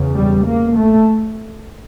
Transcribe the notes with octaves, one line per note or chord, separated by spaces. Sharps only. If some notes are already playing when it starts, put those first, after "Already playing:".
Already playing: E2 C#3
G3
A#3
A3